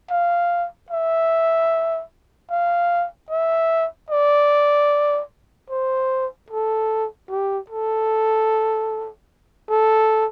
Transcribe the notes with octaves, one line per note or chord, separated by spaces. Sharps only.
F5
E5
F5
E5
D5
C5
A4
G4
A4
A4